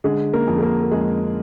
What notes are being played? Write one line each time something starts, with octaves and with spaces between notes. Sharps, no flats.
D3 G#3 G#4
A#3 A#4
F2
G#4
A#3 A#4
A#4
F2 G#3 G#4